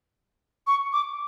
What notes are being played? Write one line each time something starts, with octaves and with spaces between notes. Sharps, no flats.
C#6
D6